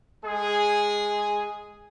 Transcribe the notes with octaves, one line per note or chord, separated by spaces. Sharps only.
G#3 G#4